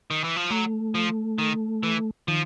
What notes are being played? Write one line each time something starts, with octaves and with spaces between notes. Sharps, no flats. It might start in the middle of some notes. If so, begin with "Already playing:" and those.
D#3
E3
F3
F#3 A3
F3
D#3
E3
D#3 F3